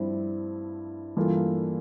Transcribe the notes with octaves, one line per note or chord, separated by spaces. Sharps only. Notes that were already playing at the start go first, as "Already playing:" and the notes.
Already playing: G2 F3 C4 E4
G2 E3 A#3 F4 A4